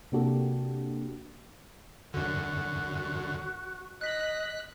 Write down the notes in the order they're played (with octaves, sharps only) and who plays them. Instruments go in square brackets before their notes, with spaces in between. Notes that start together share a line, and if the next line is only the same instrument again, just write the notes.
[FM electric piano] C3 A#3 D4 F#4 G4 A4
[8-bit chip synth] F#2 D3 [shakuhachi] F#4
[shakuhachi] D#5 [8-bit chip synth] F#6 B6